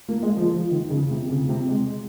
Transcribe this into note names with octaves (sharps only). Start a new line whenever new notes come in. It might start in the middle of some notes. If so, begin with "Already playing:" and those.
A#3
G#3
F3
F3
D#3
C#3
C3
C#3
C3
G#3